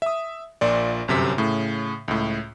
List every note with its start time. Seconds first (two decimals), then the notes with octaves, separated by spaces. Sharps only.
0.02 E5 D#6
0.61 A#1 A#2 F4 D5
1.08 G1 F#2 C3 B6
1.38 A2 C#3
2.08 C#2 A2